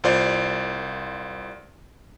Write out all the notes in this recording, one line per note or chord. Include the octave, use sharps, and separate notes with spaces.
C2 F4 C5 D5 F5